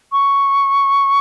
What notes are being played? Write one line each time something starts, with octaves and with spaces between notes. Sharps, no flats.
C#6